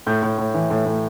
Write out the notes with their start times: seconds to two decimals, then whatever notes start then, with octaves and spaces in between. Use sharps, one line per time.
0.07 A2 G6
0.22 A2
0.38 A2
0.54 E3
0.70 A2
0.85 A2